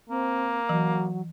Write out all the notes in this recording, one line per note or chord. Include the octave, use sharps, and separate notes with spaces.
A#3 C4
E3 F#3